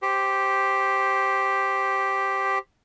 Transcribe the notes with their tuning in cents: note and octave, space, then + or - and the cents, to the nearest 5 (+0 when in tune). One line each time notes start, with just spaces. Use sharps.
G4 +0 C5 +0